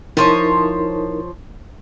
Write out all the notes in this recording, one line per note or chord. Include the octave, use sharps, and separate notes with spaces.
F3 D#4 E4 A#4 C5 C#5